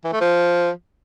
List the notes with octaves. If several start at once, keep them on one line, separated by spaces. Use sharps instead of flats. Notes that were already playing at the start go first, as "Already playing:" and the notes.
E3
A3
F3